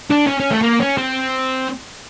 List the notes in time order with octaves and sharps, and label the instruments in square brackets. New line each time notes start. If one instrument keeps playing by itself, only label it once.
[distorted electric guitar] D4
C#4
C#4
A3
A#3
C#4
C4